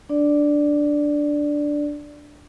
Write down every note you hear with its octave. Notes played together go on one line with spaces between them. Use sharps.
D4 D5